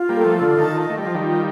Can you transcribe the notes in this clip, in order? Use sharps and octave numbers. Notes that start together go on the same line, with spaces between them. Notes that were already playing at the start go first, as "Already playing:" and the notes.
Already playing: F4
G3 A#3
A4
F3 A3
F4
D3
D#3 A5
D#5
A3
G3 D#5
F3
D#3 G3
F4